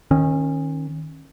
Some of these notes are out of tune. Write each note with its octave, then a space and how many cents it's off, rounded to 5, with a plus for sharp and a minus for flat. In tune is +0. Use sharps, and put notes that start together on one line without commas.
D#3 +0 C#4 -30